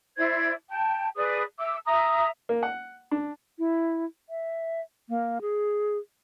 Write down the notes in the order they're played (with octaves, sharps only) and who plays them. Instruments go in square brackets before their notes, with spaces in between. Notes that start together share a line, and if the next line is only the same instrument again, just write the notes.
[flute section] E4 C5 D5 G#6
G5 A5
G#4 B4 D5 D#6
E5 D6 E6
E5 A#5 D#6
[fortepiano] A#3
F#5
D4
[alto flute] E4
E5
A#3
G#4